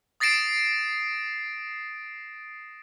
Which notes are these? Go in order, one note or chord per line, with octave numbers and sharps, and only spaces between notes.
D#6 A6 A#6 C7 D7 E7